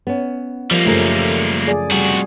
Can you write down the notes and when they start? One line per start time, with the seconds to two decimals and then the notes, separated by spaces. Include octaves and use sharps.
0.07 B3 C#4
0.71 F3 G3 A#3
0.86 F#2 C#3 A3 A#4
1.68 G#4 D5
1.91 C3 G3 F#4